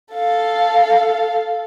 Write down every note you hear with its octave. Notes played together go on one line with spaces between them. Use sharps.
A4 F5